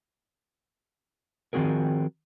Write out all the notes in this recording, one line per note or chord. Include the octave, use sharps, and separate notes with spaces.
D#3 F3 C4 F#4 G#4 A#4